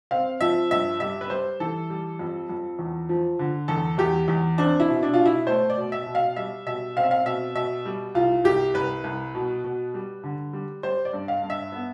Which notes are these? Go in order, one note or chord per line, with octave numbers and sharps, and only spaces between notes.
C4 F5
F3 E5
G2 E5
G3 E5
B4
G3 C5
E3 A4
G3
F2
F2
E2
F3
D3
E2 A4
E2 G4
E2
C4 D4
E4
B2
D4
B2 F4
E4
A3 C5
D5
B2
E5
B2
F5
G3 E5
B2 E5
C4 F5
E5
F5
B2 E5
B2 E5
G3
C2 F4
C2 G4
C2 B4
C2
B2
B2
G3
D3
G3
G3 C5
D5
G2
F5
G2
E5
B3